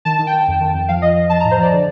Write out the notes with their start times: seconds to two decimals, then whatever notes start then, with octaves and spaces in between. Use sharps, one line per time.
0.05 D#3 A5
0.19 D#3
0.27 G5
0.33 D#3
0.48 F2
0.61 D#3
0.74 F2
0.88 F3 F5
1.02 F3 D#5
1.17 F3
1.30 F3 A5
1.40 A2 A#5
1.51 C5
1.58 F3 D5
1.72 D3